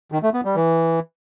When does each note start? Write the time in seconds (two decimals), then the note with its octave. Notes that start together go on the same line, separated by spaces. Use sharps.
0.12 D#3
0.23 A3
0.34 B3
0.45 G3
0.56 E3